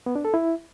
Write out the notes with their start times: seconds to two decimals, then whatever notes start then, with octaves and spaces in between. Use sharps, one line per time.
0.06 B3
0.16 D4
0.25 A4
0.34 E4